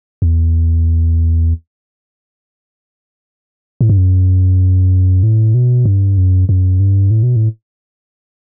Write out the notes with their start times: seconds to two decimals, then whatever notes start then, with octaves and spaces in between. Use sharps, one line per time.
0.22 E2
3.81 A2
3.90 G2
3.97 F#2
5.23 A2
5.54 B2
5.85 G2
6.17 F#2
6.49 F#2
6.80 G2
7.11 A2
7.23 B2
7.36 A2